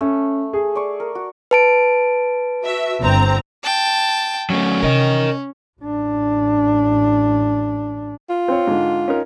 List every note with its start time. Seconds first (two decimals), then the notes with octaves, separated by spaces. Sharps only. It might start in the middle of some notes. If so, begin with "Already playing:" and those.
0.01 A3 C#4
0.53 G#4
0.75 D5 C#6
1.00 A#4
1.15 F#4
1.51 B4 A5 D7
2.64 F#4 E5
3.00 G1 C4 A#5
3.63 G5 A5
4.50 F#3 A3 C#4
4.82 C3 E3 A#4 D#5
5.80 A1 D4
8.29 F4
8.48 C4 C#5
8.67 G#2 D3
9.08 C#4 D#4 A#4